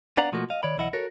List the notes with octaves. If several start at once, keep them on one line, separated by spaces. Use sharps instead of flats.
B3 D4 D5 F5 F#5 A#5
B2 F3 A3 A#3 F#4
D#5 F5
D#3 C#5 D5 B5
B1 E3 E4 D#5 F#5
F#4 A4 A#4 C#5